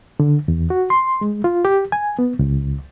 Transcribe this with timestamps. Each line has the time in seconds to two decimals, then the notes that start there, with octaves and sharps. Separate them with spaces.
0.20 D3
0.48 E2
0.70 F#4
0.90 C6
1.21 G#3
1.44 F4
1.65 G4
1.92 G#5
2.19 B3
2.39 C#2